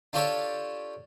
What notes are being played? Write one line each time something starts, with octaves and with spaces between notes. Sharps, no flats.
D4 F4 G4 A4 C#5 A5